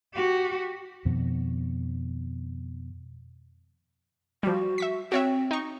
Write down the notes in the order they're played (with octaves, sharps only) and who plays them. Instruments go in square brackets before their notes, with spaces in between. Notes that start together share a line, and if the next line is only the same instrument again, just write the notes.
[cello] F#4 G4
[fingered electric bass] F2 B2 D#3
[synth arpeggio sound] F3 G3 [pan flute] F#4
[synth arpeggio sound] E5 C#6 B6
[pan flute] C4 [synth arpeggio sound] F#4 C#5 E5
[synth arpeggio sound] D#4 C#6